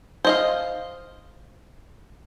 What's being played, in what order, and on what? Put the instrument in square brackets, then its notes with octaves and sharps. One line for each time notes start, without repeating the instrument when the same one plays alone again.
[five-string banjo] C5 D#5 F5